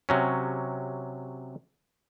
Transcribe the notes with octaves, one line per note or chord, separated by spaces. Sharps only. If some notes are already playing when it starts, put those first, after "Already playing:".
C3 F#3 C#4